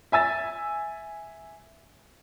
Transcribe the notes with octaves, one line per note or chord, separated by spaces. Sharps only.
E5 G#5 E6 A6